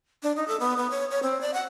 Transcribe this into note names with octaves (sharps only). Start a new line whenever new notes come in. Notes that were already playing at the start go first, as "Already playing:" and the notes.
D4
D#4
A4
B3
B3
C#5
C#5
C4
D5
F#5